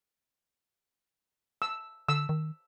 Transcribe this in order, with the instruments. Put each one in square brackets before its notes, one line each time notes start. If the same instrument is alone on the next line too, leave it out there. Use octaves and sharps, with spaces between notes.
[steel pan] E6
[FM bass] D3 [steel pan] E6
[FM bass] D#3